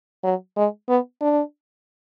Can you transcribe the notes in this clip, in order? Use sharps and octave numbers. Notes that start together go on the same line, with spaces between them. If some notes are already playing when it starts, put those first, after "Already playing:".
F#3
G#3
B3
D4